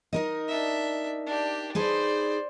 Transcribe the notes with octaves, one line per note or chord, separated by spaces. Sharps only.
D#4 A#4 D#5
D4 E5
D4 G4
D#4 G#4 B4 C5 D5